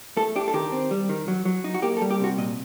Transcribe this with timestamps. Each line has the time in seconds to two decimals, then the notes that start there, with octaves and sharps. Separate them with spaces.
0.17 A3 A4
0.36 D4 G4
0.48 A4
0.53 D#3 G4
0.72 C4
0.91 G3
1.09 D#3
1.28 F#3
1.45 F#3
1.64 D#4
1.74 F#4
1.82 A#3 G4
1.97 A4
2.01 G3
2.11 G4
2.20 C3 F#4
2.38 A#2 D#5